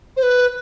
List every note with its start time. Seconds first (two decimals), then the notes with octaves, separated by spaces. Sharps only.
0.17 C5
0.23 B4